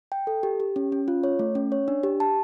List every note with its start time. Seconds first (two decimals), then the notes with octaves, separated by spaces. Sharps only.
0.12 G5
0.27 A4
0.43 G4
0.60 G4
0.76 C#4
0.92 C#4
1.08 F4
1.24 C#5
1.39 A3
1.55 C#4
1.72 C#5
1.88 D4
2.03 G4
2.20 A5